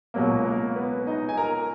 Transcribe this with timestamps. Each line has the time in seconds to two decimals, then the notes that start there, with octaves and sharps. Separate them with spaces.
0.14 C#2 B2 F#3 A#3 A#4
0.45 A#3 A#4
0.76 B3 B4
1.06 D#4 D#5
1.29 G#5
1.37 A#4 A#5